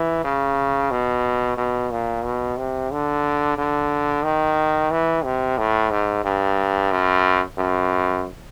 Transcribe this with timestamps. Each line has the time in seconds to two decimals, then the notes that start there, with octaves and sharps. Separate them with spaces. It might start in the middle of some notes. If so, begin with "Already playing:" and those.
Already playing: E3
0.24 C#3
0.91 B2
1.57 B2
1.91 A#2
2.24 B2
2.57 C3
2.91 D3
3.58 D3
4.24 D#3
4.91 E3
5.24 C3
5.58 A2
5.90 G#2
6.24 G2
6.91 F#2
7.58 F#2